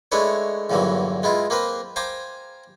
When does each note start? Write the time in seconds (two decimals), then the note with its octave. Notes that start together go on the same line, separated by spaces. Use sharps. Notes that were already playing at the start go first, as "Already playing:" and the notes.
0.12 G#3 A3 D4 E4 B4 C#5
0.70 E2 G2 A#2 D3 E3 F#3
1.23 G#3 B3 E4 F4
1.50 A#3 C4 A#4 B4
1.96 C5 F5 G5 G#5 A#5 D6